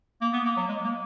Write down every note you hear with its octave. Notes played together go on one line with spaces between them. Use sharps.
A#3
B3
A#3
F#3
G#3
A#3